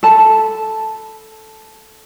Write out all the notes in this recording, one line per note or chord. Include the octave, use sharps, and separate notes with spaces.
A4 A5 B5